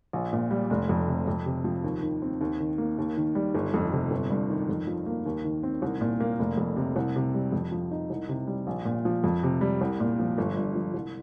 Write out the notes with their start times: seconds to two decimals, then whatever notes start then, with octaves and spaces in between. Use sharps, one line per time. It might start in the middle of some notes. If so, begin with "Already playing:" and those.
0.13 A#1
0.33 A#2
0.51 G3
0.70 F1
0.89 F2
1.08 C3
1.28 F2
1.46 C3
1.64 F3
1.84 D#2
2.03 D#3
2.22 C4
2.41 D#2
2.60 D#3
2.78 A#3
2.98 D#2
3.17 D#3
3.35 G3
3.55 G1
3.74 F2
3.92 C3
4.11 G1
4.31 G2
4.50 D#3
4.69 F2
4.87 F3
5.06 A#3
5.26 D#2
5.44 D#3
5.63 C4
5.82 C2
6.01 A#2
6.20 A#3
6.39 F1
6.57 F2
6.76 C3
6.96 C2
7.16 C3
7.34 G3
7.52 F2
7.72 F3
7.91 D#4
8.10 C2
8.29 C3
8.47 G3
8.67 A#1
8.85 A#2
9.05 F3
9.24 F2
9.43 C3
9.61 G3
9.81 C2
10.00 A#2
10.19 F3
10.38 G1
10.57 G2
10.75 F3
10.94 C2